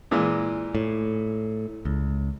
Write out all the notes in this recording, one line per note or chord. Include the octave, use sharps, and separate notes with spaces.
A#2 E3 G#3
A2
C#2